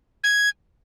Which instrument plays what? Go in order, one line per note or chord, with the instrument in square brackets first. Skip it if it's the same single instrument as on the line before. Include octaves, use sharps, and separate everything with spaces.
[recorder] G#6